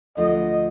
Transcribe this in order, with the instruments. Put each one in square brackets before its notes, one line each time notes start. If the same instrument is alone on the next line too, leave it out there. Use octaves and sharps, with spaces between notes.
[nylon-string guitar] D2 D3 F3 A3 [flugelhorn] D#5